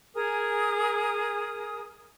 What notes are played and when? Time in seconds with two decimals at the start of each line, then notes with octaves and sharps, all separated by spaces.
0.15 G#4 A#4 G#5 D#6